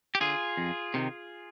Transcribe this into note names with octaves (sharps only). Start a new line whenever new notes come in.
G4
D3 F4 G#4
F2
C3 D#3